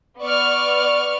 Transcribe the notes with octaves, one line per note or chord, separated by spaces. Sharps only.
B3 D5 C#6 F6